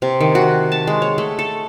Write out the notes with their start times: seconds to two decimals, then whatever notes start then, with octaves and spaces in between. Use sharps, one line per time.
0.02 C3
0.21 D#3
0.35 F#4
0.72 A5
0.87 G#3
1.02 C#5
1.18 A3
1.39 A4